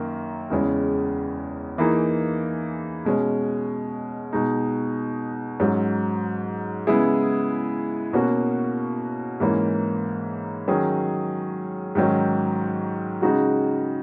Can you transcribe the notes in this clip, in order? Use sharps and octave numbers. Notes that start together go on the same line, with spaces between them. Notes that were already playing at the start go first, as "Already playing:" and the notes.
Already playing: F#2 D#3 A#3
E2 C#3 G#3 C#4
E3 A#3 D#4 G#4
B2 G#3 C#4
B2 G#3 D#4
G#2 F#3 C#4
C#3 G#3 B3 E4 G#4
B2 A#3 C#4 F#4
G#2 E3 A#3 C#4
D#3 F#3 C#4 G#4
G#2 D#3 F#3 C#4
C#3 G#3 D#4 F#4